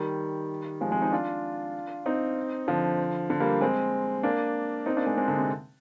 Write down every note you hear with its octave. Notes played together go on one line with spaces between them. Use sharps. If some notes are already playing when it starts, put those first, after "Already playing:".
Already playing: D#3 G3
F3 G#3
G#3 C4
C4 D#4
D4 F4
C4 D#4
D3 F3
D3
G3 A#3
G#3 C4
A#3 D4
C4 D#4
A#3 D4
G#3 C4
G#3 C4
D3
C3